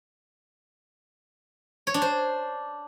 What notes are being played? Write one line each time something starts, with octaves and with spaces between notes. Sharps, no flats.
C#5
D4
C5